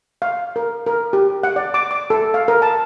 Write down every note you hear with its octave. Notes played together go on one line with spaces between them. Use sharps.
F5
A#4
A#4
G4
F#5
D5
D6
D6
A4
F5
A#4
A5